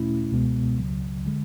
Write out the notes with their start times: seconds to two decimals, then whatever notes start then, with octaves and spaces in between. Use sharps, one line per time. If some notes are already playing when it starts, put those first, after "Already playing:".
Already playing: E2 B2 A3 C#4 E4
0.31 C#2 B2 G#3 B3
0.79 C#2 C#3 F#3
1.26 D3 G#3